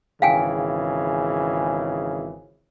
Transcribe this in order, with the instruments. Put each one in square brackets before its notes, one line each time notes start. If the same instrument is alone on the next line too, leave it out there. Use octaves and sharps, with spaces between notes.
[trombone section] G#1 C#3 E3 [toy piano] F5 G5 G#5